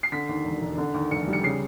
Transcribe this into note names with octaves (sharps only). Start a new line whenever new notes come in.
C7
D3 B6
D#2
E1
E1
D3
D#2
F1 C#7
G3
C#7
C#3 C7